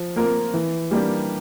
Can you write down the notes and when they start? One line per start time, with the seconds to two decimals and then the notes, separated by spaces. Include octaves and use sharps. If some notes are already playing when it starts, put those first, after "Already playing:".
Already playing: F3
0.16 A#3 F4 A#4
0.54 E3
0.91 G3 A#3 D4 G4